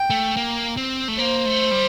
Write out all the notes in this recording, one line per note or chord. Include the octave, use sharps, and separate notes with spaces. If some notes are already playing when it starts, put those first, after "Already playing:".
Already playing: G5
A3
A#3
C4
A3
A#3 C5
A3
G3